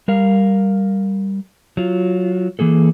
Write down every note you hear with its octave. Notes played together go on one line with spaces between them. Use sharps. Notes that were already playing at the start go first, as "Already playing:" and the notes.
G3 A#4 F5
F#3 F4
E3 A#3 G#4 A4